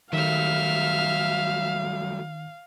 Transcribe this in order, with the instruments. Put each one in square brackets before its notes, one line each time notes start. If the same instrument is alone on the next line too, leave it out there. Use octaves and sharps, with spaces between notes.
[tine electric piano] D#3 [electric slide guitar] F#3 G3 A3 [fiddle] E5 F6 [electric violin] F5